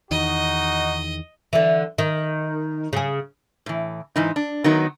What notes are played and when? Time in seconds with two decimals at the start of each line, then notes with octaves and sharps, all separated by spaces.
0.11 E2 D#3 D#4 F#4 D#5
1.53 D3 E3
1.98 D#3
2.93 C#3 G#4
3.66 A2 E3
4.16 G#2 E3 D#4
4.36 D4
4.64 D#3 F#3 B3 D#4